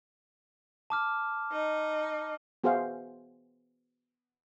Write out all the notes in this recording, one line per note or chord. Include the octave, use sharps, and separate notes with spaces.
A5 D6 F6
D#4
B3 F#4 G#4 C5 E5 F5